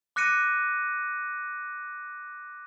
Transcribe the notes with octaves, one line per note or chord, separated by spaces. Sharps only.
D6 F#6 A#6 C#7 D#7